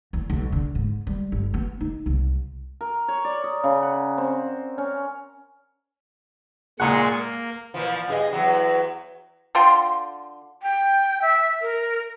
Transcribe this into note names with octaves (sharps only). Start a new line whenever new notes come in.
E2
B1
D3
G#2
G3
G1
B3
D#4
C2
A#4
C#5
D5
D#5
C#3
F#5
C4
C#4
A#2 G#3 F#5 A#5 C#6
A#3
A#2 E3 F3
G2 G#4 D#5
E2 F#3
D3 F4 G5 C6
G5
E5
A#4